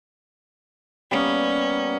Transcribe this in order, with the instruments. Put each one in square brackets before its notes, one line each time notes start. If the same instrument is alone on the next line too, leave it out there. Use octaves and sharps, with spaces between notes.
[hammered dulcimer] G3 A#3 B3 [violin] C#4